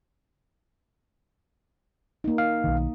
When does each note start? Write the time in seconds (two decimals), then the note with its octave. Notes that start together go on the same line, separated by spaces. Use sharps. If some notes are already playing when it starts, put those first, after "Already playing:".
2.24 A#3 D#4
2.38 F5
2.64 B1 D#3